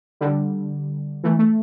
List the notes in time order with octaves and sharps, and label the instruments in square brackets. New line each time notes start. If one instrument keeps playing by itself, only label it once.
[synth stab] D3 G3
E3 A3
A3